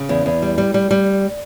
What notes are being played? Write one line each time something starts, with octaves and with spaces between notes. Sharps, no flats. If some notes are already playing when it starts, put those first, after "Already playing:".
Already playing: C#3
E2
E2
G3
G3
G3
G3